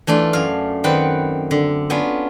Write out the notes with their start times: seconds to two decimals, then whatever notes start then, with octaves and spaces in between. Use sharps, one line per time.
0.07 E3 A3 D4 F4
0.33 F#2 F5
0.84 D#3 C4 B4 D5 F#5
1.51 D3
1.90 B3 C#4 D4 F4